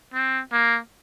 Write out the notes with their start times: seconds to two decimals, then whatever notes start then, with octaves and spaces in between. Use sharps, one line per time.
0.14 C4
0.52 A#3